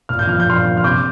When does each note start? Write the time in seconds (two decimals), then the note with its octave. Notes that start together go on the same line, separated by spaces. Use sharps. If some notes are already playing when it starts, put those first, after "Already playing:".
0.09 A#2 F6
0.19 G6
0.27 F3 F6
0.40 G6
0.47 A#2 C6 F6
0.65 F3
0.77 F6
0.84 C3 D6 G6